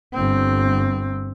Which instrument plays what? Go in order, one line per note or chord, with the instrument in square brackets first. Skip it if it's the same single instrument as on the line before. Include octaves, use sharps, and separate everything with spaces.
[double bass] G1 C4